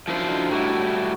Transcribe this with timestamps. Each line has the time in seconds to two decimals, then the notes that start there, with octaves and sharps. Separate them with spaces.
0.08 F#2 F3 D4 E4 C5
0.28 D3 D#4
0.51 A2 G3 E4 F#4 C#5 D#5